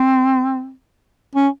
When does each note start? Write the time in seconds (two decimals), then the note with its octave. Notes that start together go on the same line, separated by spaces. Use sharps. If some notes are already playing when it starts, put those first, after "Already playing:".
Already playing: C4
1.36 C#4